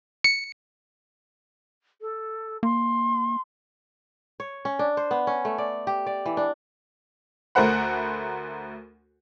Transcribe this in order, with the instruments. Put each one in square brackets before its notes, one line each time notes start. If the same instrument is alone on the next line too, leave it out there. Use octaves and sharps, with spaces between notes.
[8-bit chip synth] C#7
[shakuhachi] A4
[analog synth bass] A#3 [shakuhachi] C6
[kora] C#5
C#4
D4
C5
B3
C#4
A3
D5
G4
D5
E3
D4
[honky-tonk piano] D2 A3 A#4 C5 F#5 B5